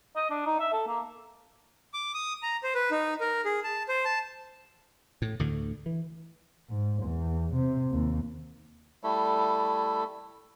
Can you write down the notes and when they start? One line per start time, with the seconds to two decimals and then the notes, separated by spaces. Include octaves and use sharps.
0.16 D#5
0.30 D4
0.46 D#4
0.59 E5
0.72 A4
0.87 A#3
1.94 D6
2.14 D#6
2.43 A#5
2.63 C5
2.75 B4
2.91 D#4
3.21 A#4
3.45 G#4
3.64 A5
3.89 C5
4.05 A5
5.22 A2
5.39 D2 A2 D3
5.86 E3
6.69 G#2
7.03 E2
7.54 C3
7.91 D#2
9.04 G3 A3 E4 A4